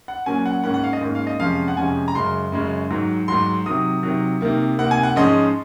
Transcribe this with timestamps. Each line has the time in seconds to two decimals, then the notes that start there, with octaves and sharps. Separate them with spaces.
0.08 F#5
0.26 A#2 F#3 A#3 C#4 G#5
0.46 F#5
0.64 G#2 D#3 A#3 C#4 F#5
0.74 F#5
0.84 F5
0.93 D#5
1.01 G#2 D#3 A#3 C#4
1.15 F5
1.27 D#5
1.40 F2 C3 F3 G#3 C#4 F5
1.68 F#5
1.77 F2 C3 F3 G#3 C#4 G#5
2.08 A#5
2.15 F#2 C#3 G#3 C#4 C6
2.52 F#2 C#3 G#3 C#4
2.90 G#2 D#3 F#3
3.28 G#2 D#3 F#3 C6
3.66 C3 D#3 F#3 D#6
4.03 C3 D#3 F#3
4.41 C3 D#3 A#3
4.79 C3 D#3 A#3 F#5
4.91 G#5
5.03 F#5
5.16 G#2 F3 G#3 C#4 D#5